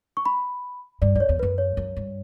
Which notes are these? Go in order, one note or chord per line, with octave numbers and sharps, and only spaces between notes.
C#6
B5
G2 D5
F#2 D5
C#5
E2
F#2 B4
C#5
F#2
G2